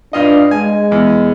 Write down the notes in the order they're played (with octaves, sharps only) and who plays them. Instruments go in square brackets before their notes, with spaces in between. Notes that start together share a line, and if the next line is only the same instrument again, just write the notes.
[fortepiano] G2 F4 D#5 [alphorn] D4
[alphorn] G#3 [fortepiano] G#5
[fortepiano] E2